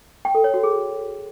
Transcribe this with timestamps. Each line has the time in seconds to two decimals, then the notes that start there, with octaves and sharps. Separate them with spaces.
0.25 G5
0.35 A4
0.44 C#5
0.54 F#4
0.63 G#4